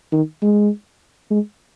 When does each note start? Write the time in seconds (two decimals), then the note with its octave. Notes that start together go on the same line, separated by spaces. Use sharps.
0.12 D#3
0.42 G#3
1.30 G#3